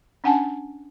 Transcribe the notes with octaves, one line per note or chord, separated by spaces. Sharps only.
C#4 D4 F#5 G#5 A5